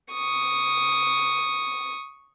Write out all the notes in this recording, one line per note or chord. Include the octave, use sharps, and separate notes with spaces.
C#6 D#6